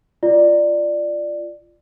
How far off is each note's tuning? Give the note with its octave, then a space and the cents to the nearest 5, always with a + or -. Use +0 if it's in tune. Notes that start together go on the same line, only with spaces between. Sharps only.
F4 -20 D5 +10